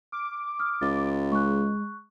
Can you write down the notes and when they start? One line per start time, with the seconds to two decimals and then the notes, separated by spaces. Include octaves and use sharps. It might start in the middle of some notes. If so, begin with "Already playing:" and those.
0.12 D6 F6
0.59 D#6 F6
0.81 C#2 A6
1.32 G#3 C#6 F#6